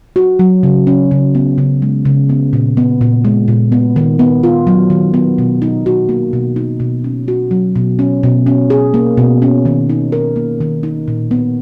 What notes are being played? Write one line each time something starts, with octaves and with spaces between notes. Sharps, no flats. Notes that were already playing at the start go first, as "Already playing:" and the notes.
F#4
F#3
C#3
C#4
C#3
B3
C#3
G#3
C#3
B3
A#2
B3
A#2
G#3
A#2
B3
D#3
B3
F4
F#3
D#3
B3
B2
D#4
F#4
A#3
B2
D#4
B2
C#4
F#4
F#3
B2
C#4
B2
C#4
G#4
A#3
B2
C#4
D#3
D#4
A#4
A#3
D#3
D#4
A#2
B3